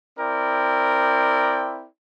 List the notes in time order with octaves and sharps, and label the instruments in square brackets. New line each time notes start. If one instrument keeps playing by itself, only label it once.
[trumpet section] C4 E4 A#4 D5 G5